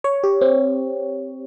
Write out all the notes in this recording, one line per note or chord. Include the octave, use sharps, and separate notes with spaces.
C#5
G4
C4